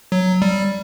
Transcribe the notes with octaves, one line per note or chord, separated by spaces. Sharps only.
F#3
G3